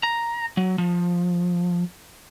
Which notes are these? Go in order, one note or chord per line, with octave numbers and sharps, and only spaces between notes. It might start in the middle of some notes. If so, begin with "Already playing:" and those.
A#5
F#3
F3